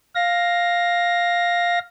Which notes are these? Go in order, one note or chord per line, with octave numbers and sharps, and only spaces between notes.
F5 A#6